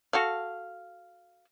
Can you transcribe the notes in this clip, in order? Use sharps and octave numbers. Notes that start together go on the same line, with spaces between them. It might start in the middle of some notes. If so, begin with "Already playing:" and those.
F#4 A4 F5